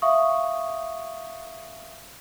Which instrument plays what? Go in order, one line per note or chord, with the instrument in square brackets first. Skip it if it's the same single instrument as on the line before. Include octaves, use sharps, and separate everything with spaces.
[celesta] E5 F5 C#6 D#6